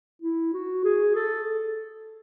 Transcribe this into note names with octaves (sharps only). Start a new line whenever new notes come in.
E4
F#4
G#4
A4